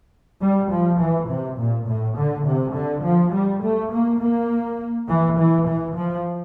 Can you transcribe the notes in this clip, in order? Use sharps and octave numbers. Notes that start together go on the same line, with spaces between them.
G3
F3
E3
C3
A#2
A2
D3
C3
D3
F3
G3
A3
A#3
A#3
E3
E3
E3
F3